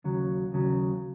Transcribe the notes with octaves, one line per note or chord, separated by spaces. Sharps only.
D#2 C#3 F#3
D#2 C#3 F#3